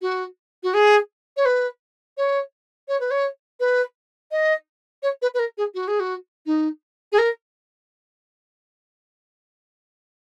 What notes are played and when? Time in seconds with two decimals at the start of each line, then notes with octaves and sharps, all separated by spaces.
0.01 F#4
0.63 F#4
0.74 G#4
1.37 C#5
1.45 B4
2.17 C#5
2.88 C#5
3.00 B4
3.11 C#5
3.60 B4
4.31 D#5
5.03 C#5
5.22 B4
5.34 B4
5.39 A#4
5.57 G#4
5.74 F#4
5.87 G#4
6.00 F#4
6.46 D#4
7.12 G#4
7.18 A#4